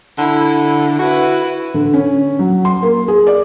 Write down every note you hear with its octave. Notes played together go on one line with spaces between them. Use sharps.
D3 E4
E4 F#4 B4
D3
C#4
F#3
C6
A#3
G#4
D5